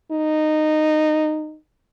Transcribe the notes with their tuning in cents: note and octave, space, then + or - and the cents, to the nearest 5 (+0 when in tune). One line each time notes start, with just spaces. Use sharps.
D#4 -15